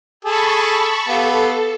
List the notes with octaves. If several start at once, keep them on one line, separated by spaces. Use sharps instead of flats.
G#4 A4 A5 B5 C#6
B3 G4 A4 F5